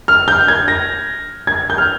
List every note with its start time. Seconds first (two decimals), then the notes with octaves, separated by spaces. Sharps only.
0.08 F6
0.28 G6
0.48 G#6
0.68 A#6
1.47 G#6
1.70 G6
1.78 F6